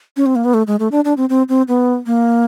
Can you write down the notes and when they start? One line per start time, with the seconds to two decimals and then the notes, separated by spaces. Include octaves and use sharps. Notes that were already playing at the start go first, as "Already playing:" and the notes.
0.17 C#4
0.26 C4
0.36 A#3
0.45 B3
0.54 A3
0.67 G#3
0.79 A3
0.92 D4
1.05 D4
1.17 C4
1.29 C4
1.49 C4
1.68 B3
2.06 A#3